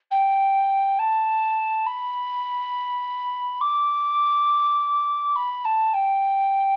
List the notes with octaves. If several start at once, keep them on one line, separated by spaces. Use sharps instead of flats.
G5
A5
B5
D6
B5
A5
G5